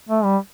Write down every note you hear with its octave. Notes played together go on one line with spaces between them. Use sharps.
A3
G3